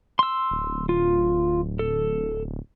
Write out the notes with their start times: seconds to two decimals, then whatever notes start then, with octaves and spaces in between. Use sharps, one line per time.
0.19 C6 E6
0.51 D1
0.89 F4
1.79 A4